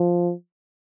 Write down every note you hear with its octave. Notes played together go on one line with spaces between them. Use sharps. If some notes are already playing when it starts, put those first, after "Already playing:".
Already playing: F3